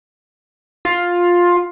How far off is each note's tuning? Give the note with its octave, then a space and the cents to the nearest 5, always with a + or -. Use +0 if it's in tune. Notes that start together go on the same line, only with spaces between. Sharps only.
F4 +10